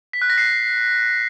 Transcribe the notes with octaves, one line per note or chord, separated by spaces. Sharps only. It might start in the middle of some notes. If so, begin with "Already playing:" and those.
B6
F#6
A#6
C7